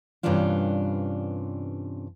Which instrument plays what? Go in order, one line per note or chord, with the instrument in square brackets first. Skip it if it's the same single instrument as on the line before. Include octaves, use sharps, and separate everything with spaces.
[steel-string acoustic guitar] G2 C3 E3 C#4 D4 F4